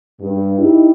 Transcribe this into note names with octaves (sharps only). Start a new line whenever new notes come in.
G2
D#4 E4 G4